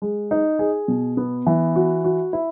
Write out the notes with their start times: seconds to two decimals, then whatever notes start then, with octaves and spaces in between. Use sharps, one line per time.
0.02 G#3
0.31 D#4
0.59 G#4
0.88 B2
1.17 B3
1.46 E3
1.76 F#4
2.04 F#4
2.33 E4